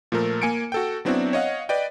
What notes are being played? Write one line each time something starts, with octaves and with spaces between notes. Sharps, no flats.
A#2 F3 A3 A4 A#4
A#3 G#5 C#7 D7
F#4 A4 G5
F#3 B3 C4 D4 E4 F#4
C#5 D#5 F5 F#5
B4 D5 D#5 G5